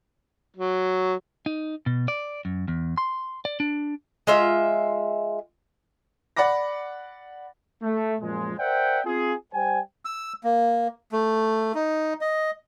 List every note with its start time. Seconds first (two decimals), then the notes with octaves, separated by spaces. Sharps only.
0.56 F#3
1.46 D#4
1.86 B2
2.08 D5
2.45 F#2
2.68 E2
2.98 C6
3.45 D5
3.60 D4
4.27 G#3 F4 E5
6.37 D5 F#5 B5 D6 A#6
7.82 A3
8.21 F#2 A#2 F3 G#3
8.58 A#4 C5 D5 E5 F#5 G5
9.05 C4 F4 G#4
9.53 G3 C5 G5 G#5
10.05 E6
10.44 A#3
11.12 A3
11.75 D#4
12.21 D#5